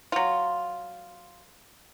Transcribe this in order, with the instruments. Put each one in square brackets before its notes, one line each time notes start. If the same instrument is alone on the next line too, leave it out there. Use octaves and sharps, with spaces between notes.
[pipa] F#3 F4